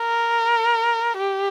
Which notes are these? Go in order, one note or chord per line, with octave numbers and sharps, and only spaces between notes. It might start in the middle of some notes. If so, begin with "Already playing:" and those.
Already playing: A#4
G4